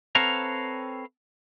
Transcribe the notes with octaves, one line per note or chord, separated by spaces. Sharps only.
C4 A4 B4 C#5 F5 A#5